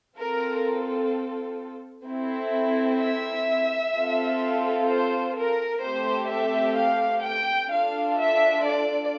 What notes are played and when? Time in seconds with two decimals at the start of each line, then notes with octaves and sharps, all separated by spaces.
0.18 C4 F4 A4 A#4
2.07 C4 E4 A4
3.00 E5
3.95 C4 F4 A4
4.89 C5
5.36 A#4
5.83 A3 C4 G4 C5
6.31 E5
6.77 F5
7.24 G5
7.71 D4 F4 A4 F5
8.18 E5
8.65 D5